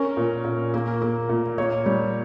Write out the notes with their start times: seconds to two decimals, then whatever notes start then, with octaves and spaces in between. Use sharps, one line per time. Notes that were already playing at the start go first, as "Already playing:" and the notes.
Already playing: C#4 A#4
0.17 A#2
0.44 A#2
0.74 A#3
1.02 A#3
1.29 A#2
1.58 A#3 C#5
1.86 G3